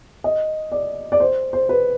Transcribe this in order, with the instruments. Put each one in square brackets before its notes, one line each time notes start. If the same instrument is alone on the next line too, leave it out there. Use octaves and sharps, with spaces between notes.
[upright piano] D#5
D5
D5
C5
C5
B4